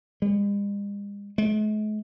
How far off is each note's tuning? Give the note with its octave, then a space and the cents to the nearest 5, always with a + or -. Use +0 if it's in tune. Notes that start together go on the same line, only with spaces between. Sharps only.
G#3 -45
G#3 +45